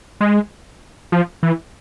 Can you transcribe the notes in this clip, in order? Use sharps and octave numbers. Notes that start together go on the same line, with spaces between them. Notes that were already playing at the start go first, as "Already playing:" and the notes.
G#3
F3
E3